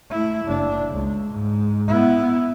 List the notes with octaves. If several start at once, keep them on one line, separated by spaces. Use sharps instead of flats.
A3 E4
F#1 D4
C#2
G#2
B3 E4